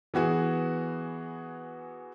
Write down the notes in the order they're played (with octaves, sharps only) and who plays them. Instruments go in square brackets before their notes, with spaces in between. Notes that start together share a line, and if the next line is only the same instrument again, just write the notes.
[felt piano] E3 B3 F#4 G#4